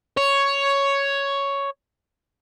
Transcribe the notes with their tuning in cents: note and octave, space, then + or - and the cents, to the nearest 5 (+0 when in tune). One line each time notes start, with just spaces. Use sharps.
C#5 +5